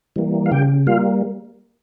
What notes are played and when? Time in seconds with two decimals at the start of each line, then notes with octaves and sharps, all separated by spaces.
0.16 E3 G3 A#3
0.46 F5
0.51 C#3 G4 G5
0.87 G3 A#3 F4 F5